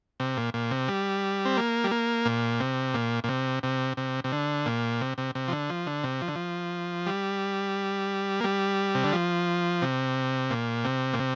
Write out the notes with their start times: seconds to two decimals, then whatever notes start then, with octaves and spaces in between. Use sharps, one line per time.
0.20 C3
0.37 A#2
0.54 A#2
0.71 C3
0.88 G3
1.45 C4
1.57 A#3
1.84 G3
1.91 A#3
2.25 A#2
2.60 C3
2.94 A#2
3.24 A#2
3.29 C3
3.63 C3
3.97 C3
4.24 C3
4.32 D3
4.66 A#2
5.01 C3
5.18 C3
5.35 C3
5.48 F3
5.52 D3
5.70 F3
5.87 D3
6.04 C3
6.22 F3
6.28 D3
6.35 F3
7.06 G3
8.41 A#3
8.44 G3
8.95 C3
9.04 D3
9.13 F3
9.82 C3
10.50 A#2
10.84 C3
11.13 A#2
11.19 C3